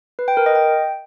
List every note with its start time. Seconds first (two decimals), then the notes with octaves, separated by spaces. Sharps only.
0.19 B4
0.28 G5
0.37 A#4
0.46 D#5
0.55 G5